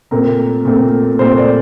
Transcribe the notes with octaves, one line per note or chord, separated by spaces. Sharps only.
A#2 A3 C4 A#4
A#2 A3 C4
A#2 A3 C4 C5
D5